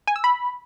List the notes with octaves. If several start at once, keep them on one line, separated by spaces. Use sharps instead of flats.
G#5
E6
B5